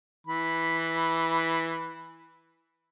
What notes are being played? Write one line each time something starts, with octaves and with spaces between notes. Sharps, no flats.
E3 B5